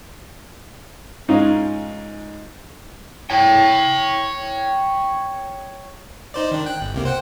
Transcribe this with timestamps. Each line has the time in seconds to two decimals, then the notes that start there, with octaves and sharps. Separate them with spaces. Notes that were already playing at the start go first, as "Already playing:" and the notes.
1.28 G#2 C#4 D#4 F4
3.30 C#5 G5
6.34 D#4 C5 D5
6.52 D#3 D4
6.66 G5 F#6
6.81 G1
6.94 C2 C3 A#3
7.05 C5 F#5 G5